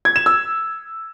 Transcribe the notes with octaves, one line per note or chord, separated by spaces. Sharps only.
G#6
E7
E6